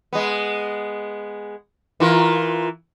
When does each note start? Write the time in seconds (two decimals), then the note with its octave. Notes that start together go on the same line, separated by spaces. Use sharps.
0.13 G#3 B3
2.00 E3 F4 A#4